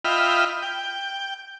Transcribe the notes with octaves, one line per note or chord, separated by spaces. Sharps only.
F4 D#5 E5 G5 B5 F6
G5